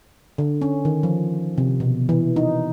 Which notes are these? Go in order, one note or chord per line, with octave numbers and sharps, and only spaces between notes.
D3
C#4
D#3
F3
C3
B2
E3
D#4